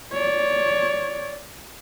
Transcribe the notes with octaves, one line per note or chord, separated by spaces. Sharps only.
C#5 D5